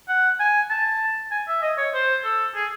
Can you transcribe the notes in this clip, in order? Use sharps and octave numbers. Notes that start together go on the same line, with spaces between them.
F#5
G#5
A5
G#5
E5
D#5
C#5
C5
A4
G#4